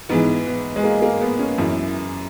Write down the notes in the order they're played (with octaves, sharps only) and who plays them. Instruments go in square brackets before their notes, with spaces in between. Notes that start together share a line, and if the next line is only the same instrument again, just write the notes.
[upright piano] G#2 E3 B3
B3
G#3
A#3
A#3
B3
C#4
F#2 E3 E4